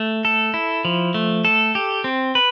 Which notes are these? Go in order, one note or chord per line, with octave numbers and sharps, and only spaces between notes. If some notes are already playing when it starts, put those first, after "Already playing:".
Already playing: A3
A4
E4
F3
A3
A4
G4
C4
B4